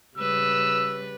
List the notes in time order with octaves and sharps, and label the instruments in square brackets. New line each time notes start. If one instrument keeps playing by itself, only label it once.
[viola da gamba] C#3 G3 B4 [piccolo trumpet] E6